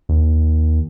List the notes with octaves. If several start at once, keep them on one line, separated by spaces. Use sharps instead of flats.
D#2